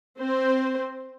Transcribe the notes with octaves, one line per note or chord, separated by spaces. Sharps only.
C4 C5